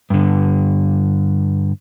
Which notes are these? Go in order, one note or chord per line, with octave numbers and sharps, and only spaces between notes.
G2 D3